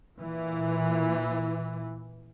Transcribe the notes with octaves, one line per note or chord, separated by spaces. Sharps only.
A#2 E3